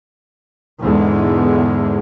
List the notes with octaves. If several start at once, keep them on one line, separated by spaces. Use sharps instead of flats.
E2 G#2 D3 G#3